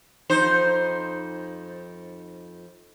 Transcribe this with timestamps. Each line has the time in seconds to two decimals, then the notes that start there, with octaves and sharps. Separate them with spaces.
0.30 F2 D#4 C5